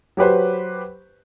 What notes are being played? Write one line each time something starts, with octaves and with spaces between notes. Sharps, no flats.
F#3 G4 B4 C5